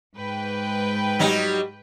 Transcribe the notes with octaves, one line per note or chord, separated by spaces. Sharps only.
G#2 B4 G5
F#3 G3 D#4